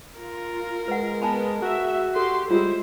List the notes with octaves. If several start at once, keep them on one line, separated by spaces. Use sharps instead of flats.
F4 A#4
G#3 B4 F#5
B3 G#5 A5 B5
F#4 G#4 E5
G4 A4 C6
G3 G#3 E4 F4 C5